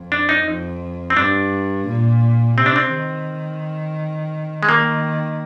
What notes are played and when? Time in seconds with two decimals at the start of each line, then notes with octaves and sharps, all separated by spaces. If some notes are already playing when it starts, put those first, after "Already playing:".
Already playing: F2
0.12 D4
0.29 D#4
0.46 F2
1.10 C4
1.17 G2 D4
1.88 A#2
2.57 C3 C4
2.66 D4
2.76 C4
2.92 D#3
4.63 G#3
4.68 D#3 A#3